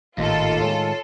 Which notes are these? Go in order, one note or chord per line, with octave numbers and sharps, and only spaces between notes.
G#1 D#2 A2 A3 F4 A4 D#5
A2 D#3 G#3 C#5